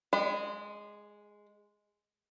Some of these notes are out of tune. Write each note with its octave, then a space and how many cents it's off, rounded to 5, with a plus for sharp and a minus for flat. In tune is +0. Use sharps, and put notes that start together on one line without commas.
G#3 +0 D#5 -40 B5 +35